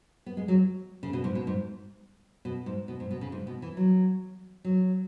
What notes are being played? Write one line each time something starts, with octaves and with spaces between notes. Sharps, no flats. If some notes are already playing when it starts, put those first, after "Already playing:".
B3
G#3
F#3
C#3
B2
G#2
B2
G#2
B2
G#2
B2
G#2
B2
C#3
G#2
B2
E3
F#3
F#3